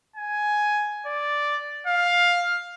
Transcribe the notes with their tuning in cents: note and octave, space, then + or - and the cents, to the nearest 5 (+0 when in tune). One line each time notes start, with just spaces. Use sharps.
G#5 +10
D5 -5
F5 +10